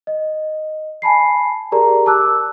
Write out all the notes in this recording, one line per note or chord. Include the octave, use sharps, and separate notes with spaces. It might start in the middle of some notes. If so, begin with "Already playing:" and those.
D#5
G#5 A5 B5 C7
G4 G#4 A#4 D5 A#5
A5 D6 E6 F#6